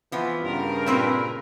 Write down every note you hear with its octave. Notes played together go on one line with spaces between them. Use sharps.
E3 F3 B3
G2 C#3 A#4
A#2 C4 B4